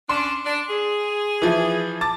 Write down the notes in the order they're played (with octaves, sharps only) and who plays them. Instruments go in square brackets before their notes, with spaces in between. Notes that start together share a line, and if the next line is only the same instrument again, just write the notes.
[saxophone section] C#4 D4 [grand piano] C6
[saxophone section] D4
G#4
[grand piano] E3 F3 E4
A5 D6 A6